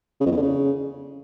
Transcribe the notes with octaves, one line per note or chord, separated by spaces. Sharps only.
C#3
F2
E2
D3
C#3